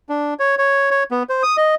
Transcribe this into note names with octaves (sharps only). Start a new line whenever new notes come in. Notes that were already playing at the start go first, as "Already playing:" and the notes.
D4
C#5
C#5
C#5
B3
C5
D#6
D#5